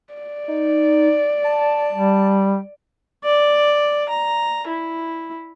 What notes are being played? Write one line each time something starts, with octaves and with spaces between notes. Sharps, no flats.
D5
D#4
A5
G3
D5
A#5
E4